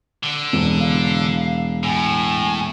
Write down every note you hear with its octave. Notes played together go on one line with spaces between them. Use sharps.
D3
E1
F5
A2 G#5